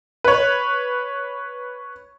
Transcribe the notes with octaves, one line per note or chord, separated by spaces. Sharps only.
B4 C#5